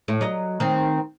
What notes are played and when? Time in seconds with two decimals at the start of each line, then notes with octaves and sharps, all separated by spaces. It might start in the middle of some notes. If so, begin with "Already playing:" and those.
0.08 A2
0.21 F#3 D#5
0.60 D#3 C4